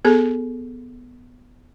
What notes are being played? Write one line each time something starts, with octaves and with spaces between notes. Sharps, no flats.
B3 G#4 A4